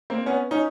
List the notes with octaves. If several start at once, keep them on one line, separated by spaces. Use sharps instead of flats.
A#3 C4
B3 C#4
C#4 D#4